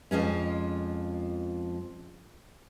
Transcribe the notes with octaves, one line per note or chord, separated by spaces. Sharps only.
F2 F3 G#3 C#4